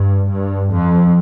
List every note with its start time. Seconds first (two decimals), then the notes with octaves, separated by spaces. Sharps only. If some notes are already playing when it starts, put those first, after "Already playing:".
Already playing: G2
0.30 G2
0.72 F2